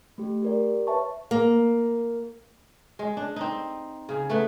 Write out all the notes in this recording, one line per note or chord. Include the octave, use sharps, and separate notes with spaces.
A3 G4
G4 A#4 D5
B4 C#5 E5 A5 C#6
A#3
G#3
D4
C4 D#4
C#3 G#4
A3 B3 B4